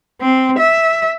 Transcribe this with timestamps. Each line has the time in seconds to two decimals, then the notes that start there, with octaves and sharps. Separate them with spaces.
0.21 C4
0.59 E5